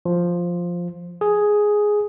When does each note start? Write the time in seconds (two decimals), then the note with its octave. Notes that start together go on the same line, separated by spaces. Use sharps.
0.05 F3
1.21 G#4